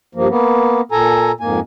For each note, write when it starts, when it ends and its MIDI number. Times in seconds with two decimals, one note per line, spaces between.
0.15 0.28 43
0.15 0.28 53
0.15 0.28 58
0.29 0.81 58
0.29 0.81 59
0.92 1.32 46
0.92 1.32 69
0.92 1.32 80
0.92 1.32 82
1.40 1.60 41
1.40 1.60 44
1.40 1.60 58
1.40 1.60 80